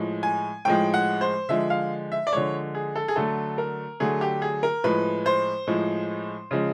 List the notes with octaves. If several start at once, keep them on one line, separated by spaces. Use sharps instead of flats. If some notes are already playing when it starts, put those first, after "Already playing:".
Already playing: A2 F3 G#3
G#5
A2 F3 G#3 G5
F#5
C5
D3 F3 G#3 E5
F5
E5
D5
D3 F3 G#3 C#5
G#4
A4
G#4
D3 F#3 A3 A4
A#4
D3 F#3 A3 G#4
G4
G#4
A#4
A2 F3 G#3 B4
C5
A2 F3 G#3
C#3 F3 G#3